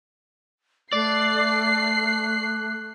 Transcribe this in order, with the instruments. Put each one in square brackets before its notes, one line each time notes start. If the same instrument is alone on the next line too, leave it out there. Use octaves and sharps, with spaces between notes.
[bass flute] A3 [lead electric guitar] D5 [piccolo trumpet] F#6 [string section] C7